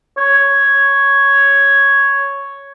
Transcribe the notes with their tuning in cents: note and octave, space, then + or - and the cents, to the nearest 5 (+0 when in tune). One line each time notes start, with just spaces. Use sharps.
C#5 +0